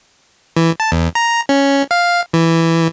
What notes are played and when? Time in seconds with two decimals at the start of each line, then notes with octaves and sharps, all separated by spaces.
0.57 E3
0.80 A5
0.92 E2
1.15 A#5
1.49 C#4
1.91 F5
2.33 E3